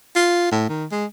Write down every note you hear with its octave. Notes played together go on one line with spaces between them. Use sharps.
F4
A2
D#3
G#3